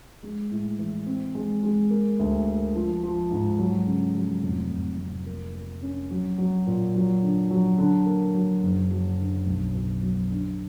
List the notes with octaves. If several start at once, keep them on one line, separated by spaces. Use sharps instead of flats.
G#3
A2
E3
C4
G#3
G#3
A#3
D2
A#3
F3
F3
G#2
F#3
C#3
F#3
F1
F1
F1
A#3
A#3
C#4
F#3
F#3
A#2
F#3
D3
F#3
D3
A#3
F#3
F#1
F#3
D3
B1
B2
F#3
D3